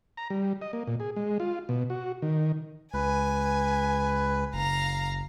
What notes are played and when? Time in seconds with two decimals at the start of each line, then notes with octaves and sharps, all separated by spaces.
0.17 A#5
0.30 G3
0.61 D#5
0.73 A#3
0.87 A#2
1.00 G#4
1.16 G#3
1.40 F4
1.69 B2
1.90 F#4
2.22 D#3
2.94 C#2 B4 G#5
4.54 F#1 F5 A#5